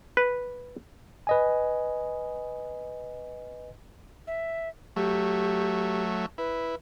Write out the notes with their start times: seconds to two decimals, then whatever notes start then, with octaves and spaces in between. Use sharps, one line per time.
0.17 B4
1.27 B4 D#5 G#5
4.27 E5
4.96 F#3 A3 G4
6.38 E4 B4